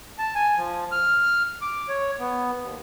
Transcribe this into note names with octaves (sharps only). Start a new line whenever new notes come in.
A5
G#5
F3
F6
D6
C#5
B3
D#2